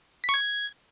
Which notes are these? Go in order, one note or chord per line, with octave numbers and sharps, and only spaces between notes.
B6
C#6
G#6